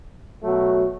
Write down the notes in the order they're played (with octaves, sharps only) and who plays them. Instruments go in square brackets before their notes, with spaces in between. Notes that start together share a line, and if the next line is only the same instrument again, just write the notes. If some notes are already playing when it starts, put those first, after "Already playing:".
[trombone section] B2 F#3 A3 F#4